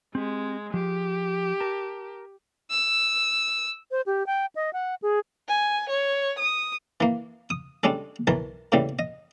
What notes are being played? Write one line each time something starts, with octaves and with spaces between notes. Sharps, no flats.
G#3 C4 G4
F3 G4 G#4
A#4 A5
E6
C5
G4
G5
D#5
F#5
G#4
G#5
C#5
D#6
E3 A#3
D#6
G3 G#3 C#4 D4 A4
B1 E3 A#4 A5
A2 C#3 E3 G3
D#5